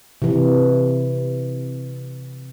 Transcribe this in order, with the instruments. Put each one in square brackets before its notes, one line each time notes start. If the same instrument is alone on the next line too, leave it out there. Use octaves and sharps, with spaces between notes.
[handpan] C3 E3